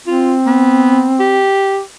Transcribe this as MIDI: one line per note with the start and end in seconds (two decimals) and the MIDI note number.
0.07 1.49 60
0.07 0.35 65
0.46 1.11 59
1.19 1.80 67